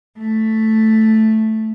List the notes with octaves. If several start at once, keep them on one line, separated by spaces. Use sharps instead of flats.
A3